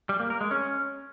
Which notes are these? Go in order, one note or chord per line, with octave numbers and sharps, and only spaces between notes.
G3
A#3
A#4
G#3
C#4